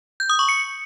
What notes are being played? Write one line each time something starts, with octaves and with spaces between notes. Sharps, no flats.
G6
D#6
C#6
C#7